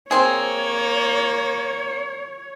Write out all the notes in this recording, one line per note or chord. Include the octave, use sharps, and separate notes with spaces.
A#3 C4 G#4 C#5